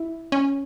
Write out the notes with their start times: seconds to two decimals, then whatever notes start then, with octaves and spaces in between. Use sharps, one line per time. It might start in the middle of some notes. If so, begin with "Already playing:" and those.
Already playing: E4
0.32 C#4